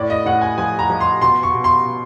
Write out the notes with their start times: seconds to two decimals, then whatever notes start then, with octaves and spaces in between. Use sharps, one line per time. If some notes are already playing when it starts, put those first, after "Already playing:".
Already playing: A2 D5
0.10 D#5
0.26 A2 F#5
0.41 G#5
0.58 F3 G#5
0.79 A#5
0.90 F3
1.01 C6
1.21 B2 C6
1.43 C#6
1.54 B2
1.64 C6
1.85 B2